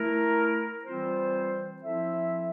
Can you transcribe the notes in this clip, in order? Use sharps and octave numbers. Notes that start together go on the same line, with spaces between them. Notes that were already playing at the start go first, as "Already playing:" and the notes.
Already playing: A3 E4 A#4
E3 G3 C4 F4 C5
F3 C4 E4 A4 E5